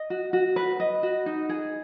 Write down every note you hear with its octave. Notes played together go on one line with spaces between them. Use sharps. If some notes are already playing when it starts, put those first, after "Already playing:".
Already playing: D#5
F#4
F#4
B4
D#5
F#4
D#4
G#4